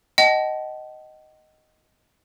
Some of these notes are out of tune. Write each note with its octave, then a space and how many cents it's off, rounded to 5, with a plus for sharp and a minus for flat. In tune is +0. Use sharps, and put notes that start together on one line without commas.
D#5 +0 F#5 +40 A5 -35